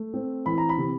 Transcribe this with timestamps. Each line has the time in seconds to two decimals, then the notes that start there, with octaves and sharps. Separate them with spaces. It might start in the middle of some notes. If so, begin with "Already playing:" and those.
Already playing: A3
0.14 C4
0.46 E3 B5
0.58 A#5
0.69 B5
0.78 C3